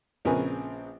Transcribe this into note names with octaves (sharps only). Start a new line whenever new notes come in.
A#1 C#3 C4 A#4 B4 G#5